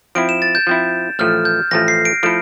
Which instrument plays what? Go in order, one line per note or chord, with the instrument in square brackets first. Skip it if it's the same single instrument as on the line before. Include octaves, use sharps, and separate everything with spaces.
[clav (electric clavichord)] F3 C4 E4 [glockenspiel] D7
[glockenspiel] E7
A6
G6
[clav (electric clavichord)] F3 C4 E4
[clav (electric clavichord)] A1 A2 F3 A3 [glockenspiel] F6
[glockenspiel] G6
[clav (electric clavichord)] A1 A2 F3 A3 [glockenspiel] A#6
[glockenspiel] C7
D7
[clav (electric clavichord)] F3 A3 E4 A4 [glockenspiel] D7